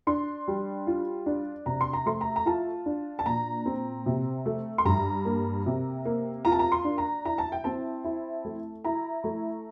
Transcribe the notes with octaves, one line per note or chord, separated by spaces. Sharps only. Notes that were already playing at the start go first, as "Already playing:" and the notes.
D4 C6
G3
F4
D4
C3 A#5
C6
A#5
A3 C6
A#5
A#5
F4 A5
D4
A5
A#2 A#5
C4
C3
A3
C6
G2 A#5
A#3
C3
A#3
F4 A#5
A5
A#5
C6
D4
A#5
E4 A#5
A5
G5
C4 A5
E4
A3
E4 A#5
A3